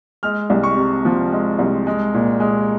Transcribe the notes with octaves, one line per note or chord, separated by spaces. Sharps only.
G#3 F6
C2
C#6
C3
F3
G#3
C2
G#3
A#2
G#3